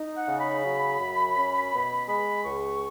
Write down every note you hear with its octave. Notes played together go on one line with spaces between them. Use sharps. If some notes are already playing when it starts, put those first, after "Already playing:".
Already playing: D#4
F#5
C#3
B5
F#3
F#2
C#4
B2
G#3 B5
C#2 C#6